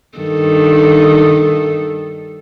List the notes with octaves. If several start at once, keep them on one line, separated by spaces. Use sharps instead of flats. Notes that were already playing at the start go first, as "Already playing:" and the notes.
G2 D#3 A4